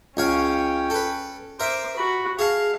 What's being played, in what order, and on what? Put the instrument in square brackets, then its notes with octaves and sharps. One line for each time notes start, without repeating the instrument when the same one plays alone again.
[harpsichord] C#2 C#5 F5 [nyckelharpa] C#4 G5
[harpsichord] A4 B4
[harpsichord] A#4 E5 [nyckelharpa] C5 D6
[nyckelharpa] F#4 B5
[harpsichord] G#4 A5 [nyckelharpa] F5